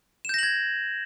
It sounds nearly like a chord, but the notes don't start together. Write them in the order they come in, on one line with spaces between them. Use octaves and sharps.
E7 G6 A#6 F#7 G#6